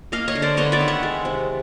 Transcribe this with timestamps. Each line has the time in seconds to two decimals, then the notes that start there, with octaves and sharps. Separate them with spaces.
0.12 A#3 D#5 F5
0.28 C#5 D#5
0.35 D3
0.42 C5 D5
0.57 B3 C#5 D#5
0.72 D5 E5
0.80 D#3
0.88 E5 F#5
1.03 G#3
1.25 C3